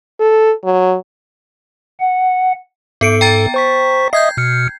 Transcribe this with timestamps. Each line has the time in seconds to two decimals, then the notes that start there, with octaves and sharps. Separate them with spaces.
0.20 A4
0.65 F#3
2.00 F#5
3.01 G#2 B3 A4 C#7 D7
3.21 G5 A#5 A6
3.54 C5 C#6 B6
4.13 D#5 E5 D#6 G6 G#6 C7
4.37 B2 F6 C#7